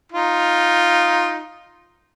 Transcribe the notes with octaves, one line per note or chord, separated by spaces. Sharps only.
D#4 F4